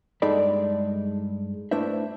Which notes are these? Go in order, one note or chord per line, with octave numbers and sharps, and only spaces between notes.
G2 G#3 D#4 A4 D5 B5
A3 D4 E4 B4 C5 E5